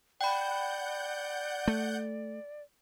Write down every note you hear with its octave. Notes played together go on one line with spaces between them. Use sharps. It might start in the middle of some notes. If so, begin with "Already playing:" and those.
D5 F#5 G5 B5 G6
A3